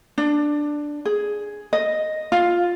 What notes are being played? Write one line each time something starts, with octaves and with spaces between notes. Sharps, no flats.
D4
G#4
D#5
F4